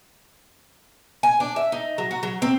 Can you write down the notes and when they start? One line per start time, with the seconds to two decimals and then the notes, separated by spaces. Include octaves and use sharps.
1.23 G#5
1.40 D4
1.56 E5
1.72 D#4
1.98 F#3
2.11 F#4
2.23 F#3
2.42 C4